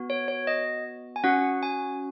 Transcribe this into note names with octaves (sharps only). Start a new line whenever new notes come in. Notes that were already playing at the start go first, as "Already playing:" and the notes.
Already playing: B3 F#4
C#5
C#5
D#5
G#5
C#4 F#4 F#5
G#5